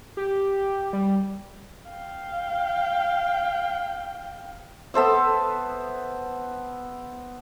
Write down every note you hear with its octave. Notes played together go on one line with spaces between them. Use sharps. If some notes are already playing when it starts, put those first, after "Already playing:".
G4
G3
F5 G5
B3 A4 C5 E5